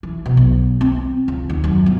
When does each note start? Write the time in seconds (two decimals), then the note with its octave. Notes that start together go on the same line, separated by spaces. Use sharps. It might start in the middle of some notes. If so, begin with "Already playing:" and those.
0.03 E3
0.26 B2
0.37 B1
0.81 C4
1.28 C#2
1.50 D#2
1.64 F#2
1.86 G1